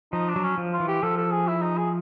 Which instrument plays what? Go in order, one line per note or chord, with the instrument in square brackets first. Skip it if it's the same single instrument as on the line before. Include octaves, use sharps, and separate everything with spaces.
[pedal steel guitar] F3 [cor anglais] D#4
[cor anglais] D4
[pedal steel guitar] F#3
[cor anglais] C#4
[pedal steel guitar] F3
[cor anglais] F4
[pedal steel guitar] E3
[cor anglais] G4
[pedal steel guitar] F3 [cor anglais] A4
[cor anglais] A4
G#4
E4
D#4
G#4